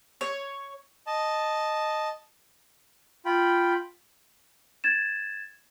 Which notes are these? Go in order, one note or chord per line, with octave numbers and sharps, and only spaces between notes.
C#5
D#5 A5
F4 G5 B5
G#6 A6 E7